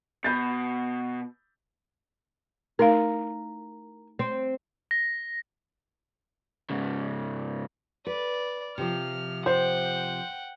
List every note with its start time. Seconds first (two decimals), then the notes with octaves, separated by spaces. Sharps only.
0.24 B2 B5 G6 A6
2.79 A3 D#4 A#4 F5
4.19 C4
4.91 A#6
6.70 G#2 C#3
8.06 B4 D5
8.78 C3 F3 F6
9.46 C5 F#5 G5